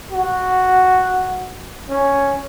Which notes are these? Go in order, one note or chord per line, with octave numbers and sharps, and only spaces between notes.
F#4
C#4